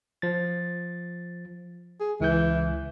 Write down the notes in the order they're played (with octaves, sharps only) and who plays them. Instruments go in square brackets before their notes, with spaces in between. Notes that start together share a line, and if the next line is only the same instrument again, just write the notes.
[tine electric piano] F3 A6
[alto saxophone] G#4
[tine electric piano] C#2 G6 [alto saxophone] E3